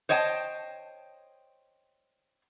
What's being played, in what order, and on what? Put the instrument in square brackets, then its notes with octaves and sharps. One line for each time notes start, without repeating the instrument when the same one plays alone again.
[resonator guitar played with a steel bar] C5 C#5 D#5 G5 A5